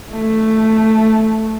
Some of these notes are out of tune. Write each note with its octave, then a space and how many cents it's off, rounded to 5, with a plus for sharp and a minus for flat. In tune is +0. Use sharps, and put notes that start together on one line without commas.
A3 +0